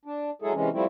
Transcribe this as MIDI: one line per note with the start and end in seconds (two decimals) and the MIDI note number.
0.05 0.31 62
0.42 0.53 54
0.42 0.53 56
0.42 0.53 64
0.42 0.53 68
0.42 0.53 69
0.54 0.69 48
0.54 0.69 52
0.54 0.69 56
0.54 0.69 61
0.73 0.85 53
0.73 0.85 55
0.73 0.85 57
0.73 0.85 60
0.73 0.85 64